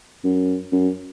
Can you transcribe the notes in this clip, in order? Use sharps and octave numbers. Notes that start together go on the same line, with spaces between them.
F#2
F#2